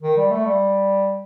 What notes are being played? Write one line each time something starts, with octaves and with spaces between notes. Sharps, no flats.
D#3
G3
A3
G3